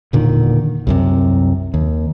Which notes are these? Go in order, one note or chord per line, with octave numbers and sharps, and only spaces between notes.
E1 A#2 D3 D#3
C2 F#2 C3
D#2